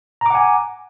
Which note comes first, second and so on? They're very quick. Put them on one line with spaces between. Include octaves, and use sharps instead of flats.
A#5 D6 F#5 G#5